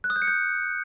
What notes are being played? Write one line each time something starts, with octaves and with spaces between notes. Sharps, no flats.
F#6
D#6
G6
C#7
G6